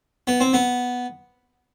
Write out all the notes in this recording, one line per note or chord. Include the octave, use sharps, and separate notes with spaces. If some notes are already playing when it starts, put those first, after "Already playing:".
B3
C4
B3